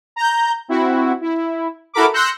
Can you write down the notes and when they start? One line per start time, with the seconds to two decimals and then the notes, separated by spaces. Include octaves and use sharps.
0.16 A#5 G6
0.68 C4 E4 F#4
1.21 E4
1.94 E4 F#4 A4 A#4 B5 D6
2.13 C6 E6 F#6 G6 A#6 C#7